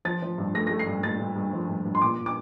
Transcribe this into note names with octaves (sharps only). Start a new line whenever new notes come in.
F3 A6
F3
G2
A3 A#6
A#6
A3
C7
G2
G2 A6
G2
G2
F3
G2
G2
C6
A#2 D6
A#2
D6